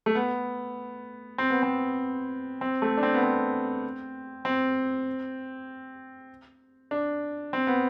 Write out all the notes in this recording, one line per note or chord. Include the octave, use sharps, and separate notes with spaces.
A3
B3
C4
B3
C4
C4
A3
D4
C4
B3
C4
C4
D4
C4
B3